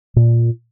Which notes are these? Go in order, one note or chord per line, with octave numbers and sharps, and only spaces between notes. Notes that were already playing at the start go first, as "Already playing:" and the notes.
A#2